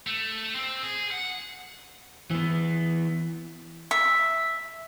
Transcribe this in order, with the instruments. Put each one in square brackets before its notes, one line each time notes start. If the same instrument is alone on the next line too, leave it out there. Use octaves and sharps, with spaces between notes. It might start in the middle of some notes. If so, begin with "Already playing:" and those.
[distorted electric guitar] A3
C4
G#4
F#5
[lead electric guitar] E3 B3
[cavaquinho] E5